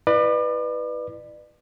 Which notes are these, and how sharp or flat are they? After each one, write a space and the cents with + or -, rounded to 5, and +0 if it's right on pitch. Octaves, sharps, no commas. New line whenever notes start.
E4 +0 B4 +0 D5 +35